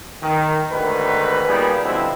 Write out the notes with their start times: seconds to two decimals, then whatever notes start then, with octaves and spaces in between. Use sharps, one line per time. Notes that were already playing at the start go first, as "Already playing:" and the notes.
0.22 D#3
0.72 D2 G#2 D#3 B4
1.48 A#2 G3 B3 D#4 G#4
1.84 B2 D3 F3 G3 C4 E4